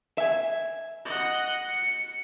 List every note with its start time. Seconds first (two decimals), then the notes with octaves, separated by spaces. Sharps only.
0.18 E5 G#5
1.06 D#5 F#5
1.69 C#7